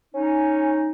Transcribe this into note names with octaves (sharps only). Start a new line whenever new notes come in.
C#4 D#4